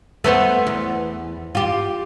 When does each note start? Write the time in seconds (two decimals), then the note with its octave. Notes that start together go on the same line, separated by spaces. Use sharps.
0.24 A3 B3 C5
0.67 E2
1.55 F4 G4